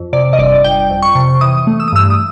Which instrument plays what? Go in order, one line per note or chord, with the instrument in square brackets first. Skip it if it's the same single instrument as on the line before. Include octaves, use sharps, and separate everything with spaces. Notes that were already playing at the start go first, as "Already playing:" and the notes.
Already playing: [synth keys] F2
C3 D5
D#5
G1 D5
G1 G5
F2
C#6
C3
E3 D#6
A3
E6
D#6
G2 E6
D#6